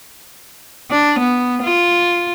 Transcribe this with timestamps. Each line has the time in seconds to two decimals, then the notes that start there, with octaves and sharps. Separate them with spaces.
0.91 D4
1.19 B3
1.63 F4